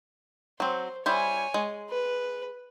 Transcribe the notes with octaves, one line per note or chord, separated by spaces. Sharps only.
F#3 C4 C5
G3 E4 C5 C#5 G#5
G#3
B4